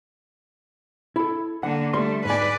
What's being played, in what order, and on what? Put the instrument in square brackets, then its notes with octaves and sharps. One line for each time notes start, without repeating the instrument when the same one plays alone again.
[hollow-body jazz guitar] E4 A4
[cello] D3 A#3 [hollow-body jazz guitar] F#5
[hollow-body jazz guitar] G3 C6 [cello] A3
[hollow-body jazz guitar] G#2 G#5 [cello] B4 D5